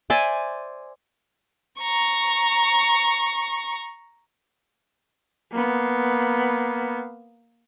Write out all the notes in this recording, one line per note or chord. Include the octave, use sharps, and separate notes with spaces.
C5 D5 E5 G#5
A#5 C#6
A#3 B3